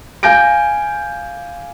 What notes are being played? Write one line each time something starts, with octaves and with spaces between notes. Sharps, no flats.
F5 G#5 G6 A#6 D7